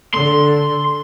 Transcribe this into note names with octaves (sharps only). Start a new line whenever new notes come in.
D3 C6